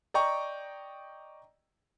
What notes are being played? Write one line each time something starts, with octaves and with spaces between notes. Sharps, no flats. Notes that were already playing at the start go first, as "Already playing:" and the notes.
D5 D#5 G5 A#5 C#6